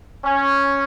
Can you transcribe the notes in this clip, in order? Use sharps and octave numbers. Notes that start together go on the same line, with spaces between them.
C#4